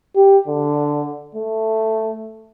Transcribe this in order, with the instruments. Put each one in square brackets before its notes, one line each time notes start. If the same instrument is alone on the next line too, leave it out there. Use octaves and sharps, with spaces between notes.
[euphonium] G4
D3
A3